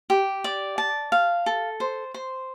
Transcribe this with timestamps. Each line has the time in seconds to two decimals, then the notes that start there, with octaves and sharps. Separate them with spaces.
0.10 G4
0.44 D5
0.78 A5
1.12 F5
1.46 A4
1.80 C5
2.14 C5